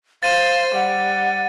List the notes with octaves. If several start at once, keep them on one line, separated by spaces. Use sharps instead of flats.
C5 F5 A6 D#7
G3 F#5